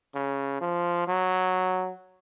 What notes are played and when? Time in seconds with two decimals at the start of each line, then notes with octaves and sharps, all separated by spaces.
0.15 C#3
0.61 F3
1.08 F#3